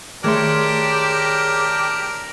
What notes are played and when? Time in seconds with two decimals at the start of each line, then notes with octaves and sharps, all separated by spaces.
0.24 D#3 A3 D4 G4 G#4 A#4 C#5 C6